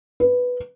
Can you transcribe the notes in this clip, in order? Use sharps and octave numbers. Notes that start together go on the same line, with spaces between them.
B4